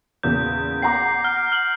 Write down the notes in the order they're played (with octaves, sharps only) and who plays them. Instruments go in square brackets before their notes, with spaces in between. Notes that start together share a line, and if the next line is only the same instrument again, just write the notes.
[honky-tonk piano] E2 A#2 C#3 [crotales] G6
[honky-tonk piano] F#5 A#5 D6 [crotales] C7
[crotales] F6
F6 F#7